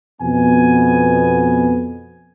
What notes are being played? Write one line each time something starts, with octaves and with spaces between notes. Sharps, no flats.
F2 B2 B3 G#5